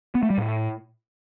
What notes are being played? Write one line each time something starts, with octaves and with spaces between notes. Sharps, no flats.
B3
A3
G3
A2